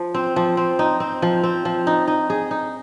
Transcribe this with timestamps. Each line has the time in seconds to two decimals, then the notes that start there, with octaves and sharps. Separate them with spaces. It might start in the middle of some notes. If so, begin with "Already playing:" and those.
Already playing: F3
0.14 C4
0.36 F3
0.57 C4
0.79 D#4
1.00 C4
1.22 F3
1.43 C4
1.65 F3
1.87 D#4
2.08 D#4
2.30 G#4
2.51 D#4